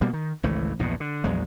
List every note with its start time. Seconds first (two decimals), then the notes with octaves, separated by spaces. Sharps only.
0.01 B2 G3 A#3
0.13 D#3
0.43 G#1 C#2 E3 A3
0.79 A#1 E2 G2 B2
1.00 D3
1.24 A#1 E2 F#3 G#3